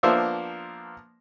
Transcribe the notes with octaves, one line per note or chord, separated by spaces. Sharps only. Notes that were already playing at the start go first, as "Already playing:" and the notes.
F3 A#3 B3 D4 C5 E5